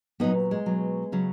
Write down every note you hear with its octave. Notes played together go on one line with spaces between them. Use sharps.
A#2 F#3 B3 D#4
G#3
B2 F#3
C#3 F#3